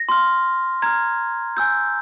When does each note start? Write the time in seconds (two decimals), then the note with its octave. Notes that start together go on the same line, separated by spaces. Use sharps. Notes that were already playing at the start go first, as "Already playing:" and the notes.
Already playing: A#6
0.09 C6 F6
0.82 A#5 F6 G#6
1.57 G#5 E6 G6